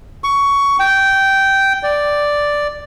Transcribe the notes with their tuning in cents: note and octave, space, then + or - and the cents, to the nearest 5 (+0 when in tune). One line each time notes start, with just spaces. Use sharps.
C#6 +15
G5 -10
D5 +0